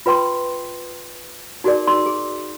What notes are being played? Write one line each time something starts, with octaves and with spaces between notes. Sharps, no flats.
F4 B4 G5 C6
D#4 F#4 G#4 A#4 D5
D#4 C6 E6
G#4